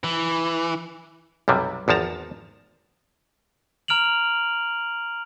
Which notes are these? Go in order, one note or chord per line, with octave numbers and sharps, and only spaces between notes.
E3
B1 F#2 C3 G3
G#1 E2 F3 A5 A#5
A#5 F6 D7 F7 F#7